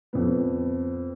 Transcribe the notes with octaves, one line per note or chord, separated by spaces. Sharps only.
F2 B3